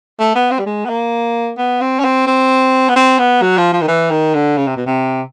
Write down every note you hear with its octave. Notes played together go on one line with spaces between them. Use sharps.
A3
B3
C4
G3
G#3
B3
A#3
B3
C4
C#4
C4
C4
B3
C4
B3
F#3
F3
F3
D#3
E3
D#3
D3
C#3
C3
B2
C3